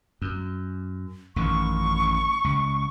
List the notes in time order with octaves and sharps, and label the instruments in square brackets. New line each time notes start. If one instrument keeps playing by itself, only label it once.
[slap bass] F#2
[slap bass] A1 F#2 D#3 [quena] C#6
[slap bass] C#2